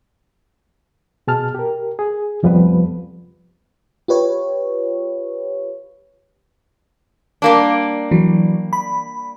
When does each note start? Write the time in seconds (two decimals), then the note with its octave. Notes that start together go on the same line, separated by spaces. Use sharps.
1.27 B2 G#4 A5 F6
1.55 G4 A#4
1.99 G#4
2.43 C2 F2 F3 G3 B3 B4
4.08 F4 G4 B4 C#5
7.42 G3 A#3 D4
8.11 E3 F#3
8.73 B5